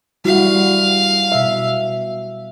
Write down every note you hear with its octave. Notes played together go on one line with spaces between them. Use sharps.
G3 E4 F#4 F5
B2 E5